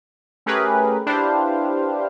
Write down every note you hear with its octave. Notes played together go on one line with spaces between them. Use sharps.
A3 C#4 G4 G#4 A#4 B4
D4 E4 G4 B4 C5 F5